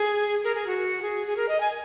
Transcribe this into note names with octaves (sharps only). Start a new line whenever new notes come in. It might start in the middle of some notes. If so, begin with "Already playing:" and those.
Already playing: G#4
A#4
G#4
F#4
G#4
G#4
A#4
D#5
G#5